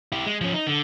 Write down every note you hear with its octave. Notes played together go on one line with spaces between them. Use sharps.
E4 G4
G#3
F3 C#4
D#4
D3